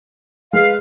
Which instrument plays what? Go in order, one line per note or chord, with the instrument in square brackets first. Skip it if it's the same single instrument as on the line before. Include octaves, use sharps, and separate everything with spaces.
[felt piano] G#3 [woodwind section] B4 F5